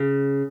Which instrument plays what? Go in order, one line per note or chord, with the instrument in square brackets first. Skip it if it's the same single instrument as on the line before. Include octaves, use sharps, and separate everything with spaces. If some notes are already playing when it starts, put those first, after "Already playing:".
Already playing: [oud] C#3